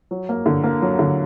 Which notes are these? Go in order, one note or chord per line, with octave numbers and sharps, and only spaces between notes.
F#3
A#3
D3
A#3
F#3
D3